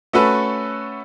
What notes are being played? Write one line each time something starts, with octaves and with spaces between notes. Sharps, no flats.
A3 C#4 F#4 A4 B4